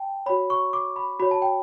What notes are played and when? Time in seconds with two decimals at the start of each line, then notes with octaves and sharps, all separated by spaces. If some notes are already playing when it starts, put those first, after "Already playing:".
Already playing: G5 A5
0.26 C#5 B5
0.30 F#4
0.50 C#6
0.73 D6
0.96 B5
1.20 F#4 C#5 B5
1.31 A5
1.42 G5